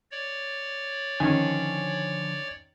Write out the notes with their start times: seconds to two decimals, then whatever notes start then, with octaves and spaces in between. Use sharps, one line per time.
0.11 C#5 D5
1.20 D3 D#3 F3 C#4 G#5